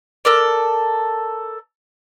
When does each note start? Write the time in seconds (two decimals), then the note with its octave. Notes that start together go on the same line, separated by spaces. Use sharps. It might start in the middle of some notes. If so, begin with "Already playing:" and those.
0.25 A4 A#4 D5